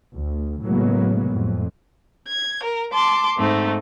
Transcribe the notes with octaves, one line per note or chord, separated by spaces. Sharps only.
D2
A2 C#3 F#3 G#3 A#3 B3
F2 A2
G#6
A#4
A5 C6 D6
G#2 A3 C4 D#4